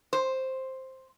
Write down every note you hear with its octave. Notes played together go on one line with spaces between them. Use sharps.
C5